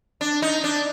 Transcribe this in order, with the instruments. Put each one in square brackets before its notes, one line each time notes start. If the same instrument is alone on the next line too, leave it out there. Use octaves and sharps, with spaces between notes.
[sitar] D4
D#4
D4